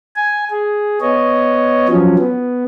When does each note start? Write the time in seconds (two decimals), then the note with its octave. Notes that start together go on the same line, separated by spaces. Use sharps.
0.16 G#5
0.50 G#4
1.01 B3 C#5 D#5
1.88 F3 F#3 C#4
2.19 B3